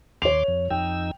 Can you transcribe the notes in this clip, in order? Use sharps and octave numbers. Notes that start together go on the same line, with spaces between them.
D#2 C#5 C6 D6 F7
F2
F2 D#4 G5 E6